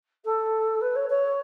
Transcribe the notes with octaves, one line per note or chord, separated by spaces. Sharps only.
A4
B4
C#5
C#5